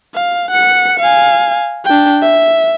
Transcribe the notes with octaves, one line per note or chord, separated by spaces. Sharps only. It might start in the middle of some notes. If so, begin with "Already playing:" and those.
F5
F#5 C#7
F5 G#5
D4 G5
E5